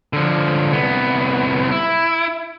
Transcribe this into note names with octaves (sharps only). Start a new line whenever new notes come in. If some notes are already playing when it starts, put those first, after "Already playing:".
D3 F3
C2 B3
E4